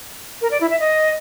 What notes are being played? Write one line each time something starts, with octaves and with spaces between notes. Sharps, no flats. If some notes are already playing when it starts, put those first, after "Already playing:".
A#4
D5
E4
E5
D#5